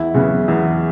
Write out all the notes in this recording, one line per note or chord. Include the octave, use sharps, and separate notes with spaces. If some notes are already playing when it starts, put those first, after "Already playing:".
Already playing: E2 E4
C#3 F#3 B3
E2